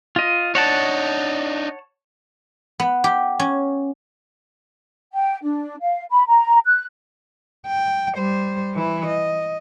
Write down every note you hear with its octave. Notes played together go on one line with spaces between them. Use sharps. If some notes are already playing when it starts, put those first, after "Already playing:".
F4 D#5
D4 D#4 C#5 F#5 A5
B3
G4
C#4
G5
D4
F5
B5
A#5
F#6
G5
G3 C5
E3 E4
D#5